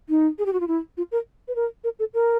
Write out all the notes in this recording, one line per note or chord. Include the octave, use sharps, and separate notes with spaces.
D#4
G#4
G4
F#4
F4
E4
F4
A#4
B4
A#4
A#4
A4
A#4